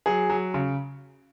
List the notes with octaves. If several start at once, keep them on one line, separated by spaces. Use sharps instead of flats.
F#3 G#4
F#3
C#3